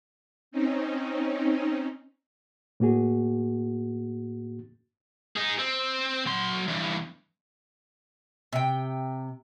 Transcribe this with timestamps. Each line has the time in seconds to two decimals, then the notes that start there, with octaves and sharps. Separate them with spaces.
0.51 C4 C#4 D#4
2.80 A2 A#3 F#4 G#4
5.36 D#4 G#4
5.59 C4
6.26 F#3 C6
6.68 E2 G2
8.53 C3 G5